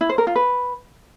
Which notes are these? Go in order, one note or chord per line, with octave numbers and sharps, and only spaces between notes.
E4
C5
A#4
F4
B4